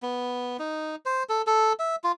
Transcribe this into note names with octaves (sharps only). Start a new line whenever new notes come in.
B3
D#4
C5
A4
A4
E5
F4